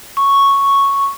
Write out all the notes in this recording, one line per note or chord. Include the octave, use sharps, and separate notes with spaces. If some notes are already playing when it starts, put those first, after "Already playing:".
C#6